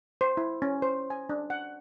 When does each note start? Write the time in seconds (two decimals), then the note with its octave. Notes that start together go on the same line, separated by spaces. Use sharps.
0.21 C5
0.37 E4
0.62 C#4
0.82 C5
1.10 G#5
1.29 D4
1.50 F#5